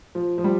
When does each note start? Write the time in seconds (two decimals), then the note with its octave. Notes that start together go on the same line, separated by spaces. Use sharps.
0.15 F3
0.38 F3
0.44 G3